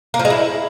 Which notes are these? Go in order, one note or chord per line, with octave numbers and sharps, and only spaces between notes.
A#3
F3
G#3
E4